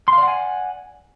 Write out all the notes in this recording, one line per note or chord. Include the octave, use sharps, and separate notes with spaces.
D5 F5 F#5 G#5 C6